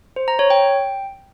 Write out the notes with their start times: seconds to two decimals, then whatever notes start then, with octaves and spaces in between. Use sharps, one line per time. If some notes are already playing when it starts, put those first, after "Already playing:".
0.16 C5
0.28 A#5
0.39 C#5
0.50 G5